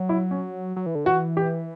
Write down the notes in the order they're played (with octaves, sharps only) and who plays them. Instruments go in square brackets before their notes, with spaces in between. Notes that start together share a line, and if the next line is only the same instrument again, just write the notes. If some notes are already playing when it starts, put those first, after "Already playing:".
Already playing: [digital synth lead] F#3
[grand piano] E4
C#4
[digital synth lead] F#3
E3
D3
[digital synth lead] E3 [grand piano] F#4
[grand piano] G4